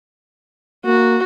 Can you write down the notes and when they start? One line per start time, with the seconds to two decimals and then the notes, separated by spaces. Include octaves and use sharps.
0.85 A#3 F#4